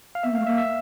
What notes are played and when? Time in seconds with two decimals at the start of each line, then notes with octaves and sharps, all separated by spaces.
0.15 F5
0.23 B3 E5
0.31 A#3
0.35 F5
0.39 A3
0.46 A#3 E5
0.58 E5